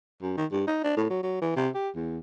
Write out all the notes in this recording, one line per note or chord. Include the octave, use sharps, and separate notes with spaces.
F#2
D#3
G2
D#4
D4
A2
F#3
F#3
E3
C3
G4
E2